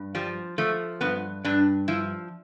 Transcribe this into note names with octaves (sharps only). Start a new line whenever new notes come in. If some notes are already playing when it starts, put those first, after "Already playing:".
Already playing: G2
F3 G3
F3 A3
G2 B3
G2 D4
F3 E4